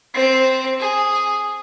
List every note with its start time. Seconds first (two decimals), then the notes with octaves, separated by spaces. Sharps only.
0.14 C4
0.79 G#4